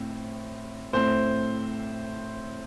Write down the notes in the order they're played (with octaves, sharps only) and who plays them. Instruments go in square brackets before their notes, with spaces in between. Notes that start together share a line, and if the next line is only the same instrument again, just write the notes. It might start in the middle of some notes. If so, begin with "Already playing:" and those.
Already playing: [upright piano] A2 C4
A2 A3 C4 C5